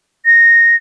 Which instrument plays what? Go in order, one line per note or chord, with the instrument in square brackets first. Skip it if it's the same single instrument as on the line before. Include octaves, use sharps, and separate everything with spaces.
[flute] A#6